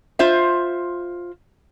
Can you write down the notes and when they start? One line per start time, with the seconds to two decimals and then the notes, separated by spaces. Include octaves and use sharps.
0.19 F4 C5 E5